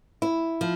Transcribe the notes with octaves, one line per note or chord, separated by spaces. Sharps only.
E4
F3